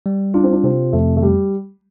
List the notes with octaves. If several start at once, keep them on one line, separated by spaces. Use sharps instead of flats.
G3
D4 F4
C4
D4
C3 C4
F2 A3
A3
G3